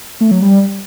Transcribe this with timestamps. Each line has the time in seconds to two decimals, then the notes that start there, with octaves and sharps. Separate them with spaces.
0.21 A3
0.31 F#3
0.42 G3